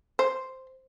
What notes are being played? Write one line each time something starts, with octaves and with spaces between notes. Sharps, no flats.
C5